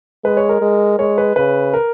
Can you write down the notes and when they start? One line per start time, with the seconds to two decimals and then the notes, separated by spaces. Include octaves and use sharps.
0.24 G#3 B4
0.37 C#5
0.49 A#4
0.62 G#3
0.99 G#3 C#5
1.18 B4
1.36 C#3 B4
1.74 A#4